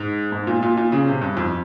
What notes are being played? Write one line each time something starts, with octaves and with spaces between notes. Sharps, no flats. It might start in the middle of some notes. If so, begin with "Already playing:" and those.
Already playing: G#2
G#2
A#2
A#2
A#2
C#3
C3
G2
F2